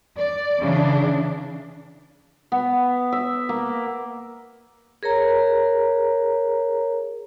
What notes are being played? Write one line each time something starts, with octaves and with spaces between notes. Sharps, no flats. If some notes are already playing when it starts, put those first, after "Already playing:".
D5
C#3 E3 D4
B3
E5
A#3
G#4 A#4 C#5 A#5